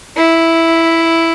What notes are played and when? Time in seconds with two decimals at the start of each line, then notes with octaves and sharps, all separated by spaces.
0.17 E4